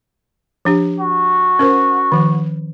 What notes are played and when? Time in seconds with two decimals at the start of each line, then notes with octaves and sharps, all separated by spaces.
0.65 F3 D4 G4
1.00 F#4
1.59 C#4 A#4 C5
2.12 D#3 F3